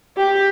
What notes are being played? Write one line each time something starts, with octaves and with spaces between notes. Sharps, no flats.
G4